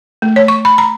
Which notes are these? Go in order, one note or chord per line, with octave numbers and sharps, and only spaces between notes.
A3
C#5
C#6
B5
A#5